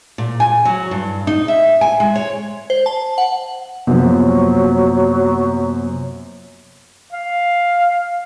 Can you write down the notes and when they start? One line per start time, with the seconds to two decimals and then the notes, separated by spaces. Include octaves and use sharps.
0.18 A#2
0.40 G#5
0.65 F#3
0.91 G2
1.27 D#4
1.48 E5
1.81 G#5
2.00 G#3
2.15 C#5
2.70 C5
2.86 A5
3.18 F#5
3.87 F#2 C3 F3 F#3 A#3 B3
7.13 F5